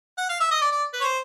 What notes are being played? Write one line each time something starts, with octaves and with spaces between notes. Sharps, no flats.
F#5
F5
E5
D#5
D5
D5
B4
C#5
C5